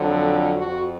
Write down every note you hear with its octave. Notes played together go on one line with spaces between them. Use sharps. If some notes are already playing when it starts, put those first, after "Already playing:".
Already playing: F2 D3 F#3
F2 F3 F#4